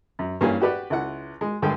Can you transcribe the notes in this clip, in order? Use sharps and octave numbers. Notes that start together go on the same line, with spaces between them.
F#2
G2 E3 A#3 C#4 G4 G#5
F#4 G4 B4 D5 F#5
C#2 E4 F#5
G#3
G2 D3 G#3 G5